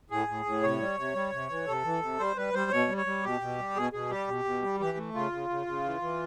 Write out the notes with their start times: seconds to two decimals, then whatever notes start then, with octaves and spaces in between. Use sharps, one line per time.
0.10 A2 G#4
0.28 A2
0.46 A2
0.63 C3 C#5
0.80 G3
0.98 C3
1.15 G3
1.32 C3
1.50 E3
1.67 C3 A4
1.84 E3
2.02 C3
2.19 G3 C5
2.36 G3 B4
2.54 G3 C5
2.71 B2 C#5
2.88 G3
2.97 C#5
3.06 G3
3.23 B2 G4
3.41 B2
3.58 G3
3.75 B2 G#4
3.93 B2 G#4
4.10 G3 G4
4.28 B2
4.45 B2
4.62 G3
4.80 E3 G4
4.97 A3
5.15 C#3 F4
5.32 C#3
5.50 C#3
5.67 C#3
5.84 E3
6.02 E3